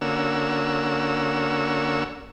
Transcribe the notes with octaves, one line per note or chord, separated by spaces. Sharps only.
D3 A#3 C#4 F#4 E6